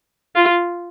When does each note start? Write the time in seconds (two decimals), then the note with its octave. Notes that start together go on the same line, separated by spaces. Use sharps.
0.35 F4